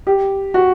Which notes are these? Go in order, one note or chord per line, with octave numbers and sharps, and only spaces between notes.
G4
F#4